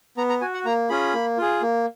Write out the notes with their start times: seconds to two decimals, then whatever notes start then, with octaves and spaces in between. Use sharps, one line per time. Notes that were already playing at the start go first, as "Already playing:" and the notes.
0.17 B3 A#5
0.29 A#5
0.41 F#4 G#5
0.54 F#5
0.65 A#3 A#5
0.89 C#4 F4 G#4 B5
1.14 A#3
1.38 F4 G#4
1.62 A#3